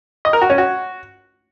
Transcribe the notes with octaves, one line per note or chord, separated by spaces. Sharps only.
D#5
A#4
F#4
C#4
F#4